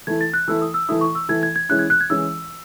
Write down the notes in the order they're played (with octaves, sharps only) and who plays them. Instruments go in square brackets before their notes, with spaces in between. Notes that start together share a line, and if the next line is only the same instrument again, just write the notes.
[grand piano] E3 A3 E4 [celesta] G#6
[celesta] A6
F#6
[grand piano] E3 A3 E4 [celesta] E6
[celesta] D#6
E6
[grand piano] E3 A3 E4 [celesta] D#6
[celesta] C#6
E6
[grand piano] E3 A3 E4 [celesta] G#6
[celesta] G#6
G#6
[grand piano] E3 G#3 C#4 E4 [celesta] F#6
[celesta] G#6
F#6
G#6
[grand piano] E3 G#3 C#4 E4 [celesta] E6